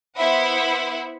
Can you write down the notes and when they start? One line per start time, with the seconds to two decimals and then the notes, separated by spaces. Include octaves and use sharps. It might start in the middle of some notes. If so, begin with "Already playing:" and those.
0.16 B3 E4 C5 E5 F#5 B5